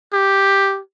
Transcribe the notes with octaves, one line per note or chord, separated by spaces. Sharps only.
G4